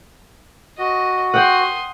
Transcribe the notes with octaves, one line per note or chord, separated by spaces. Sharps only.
F#4 D#5
F#5 G5 C6 D#6